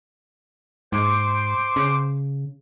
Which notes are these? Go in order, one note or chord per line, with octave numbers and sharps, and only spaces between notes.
G#2 C5 D6
C#3